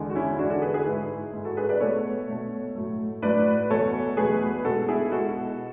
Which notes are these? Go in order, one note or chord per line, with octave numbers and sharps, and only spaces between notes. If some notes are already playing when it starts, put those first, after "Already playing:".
Already playing: E2 D3 G#3
F#4
C#4 E4
E2 D3 G#3 D4 F#4
F#4 A4
G#4 B4
G#4 B4
G#2 G#3 E4 G#4
G#2 G#3
F#4 A4
G#4 B4
B4 D5
B2 A3 A4 C#5
B2 A3
A2 F#3 A3
A2 F#3 A3 B4 D5
E2 B2 F#3 A3 A4 C#5
E2 B2 F#3 A3 G#4 B4
B2 G#3 F#4 A4
E4 G#4
B2 G#3 F#4 A4